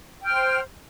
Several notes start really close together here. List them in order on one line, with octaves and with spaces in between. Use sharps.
G5 F6 C5